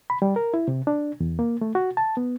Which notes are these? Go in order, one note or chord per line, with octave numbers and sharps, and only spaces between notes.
B5
G3
A#4
E4
C3
D4
E2
A#3
A3
F#4
A5
B3